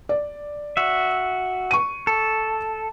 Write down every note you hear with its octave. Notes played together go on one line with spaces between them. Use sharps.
D5
F#4 E5
C#6 D#7
A4